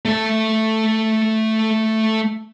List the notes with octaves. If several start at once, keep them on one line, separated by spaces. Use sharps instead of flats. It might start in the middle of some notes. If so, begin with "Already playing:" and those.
A3 A5